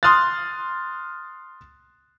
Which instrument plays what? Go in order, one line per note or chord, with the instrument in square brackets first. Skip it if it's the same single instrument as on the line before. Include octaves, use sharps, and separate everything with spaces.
[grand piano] C6 D#6 F6 F#6 A6